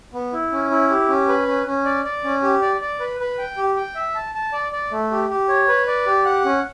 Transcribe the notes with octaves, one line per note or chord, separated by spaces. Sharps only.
B3
E4
C#4
E4
G4
C#4
B4
C#4
C#4
D5
D5
C#4
G4
D5
D5
B4
B4
G5
G4
G5
E5
A5
A5
D5
D5
A3
G4
G4
C#5
B4
D5
G4
F#5
C#4